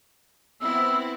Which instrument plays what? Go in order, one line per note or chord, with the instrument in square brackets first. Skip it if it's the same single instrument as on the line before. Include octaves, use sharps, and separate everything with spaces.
[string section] B3 C4 E4 [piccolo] E6